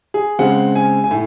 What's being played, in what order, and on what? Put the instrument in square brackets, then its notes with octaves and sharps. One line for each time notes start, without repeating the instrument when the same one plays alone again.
[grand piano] G#4
C#3 G#3 C4 F#5
G#5
G#5
A2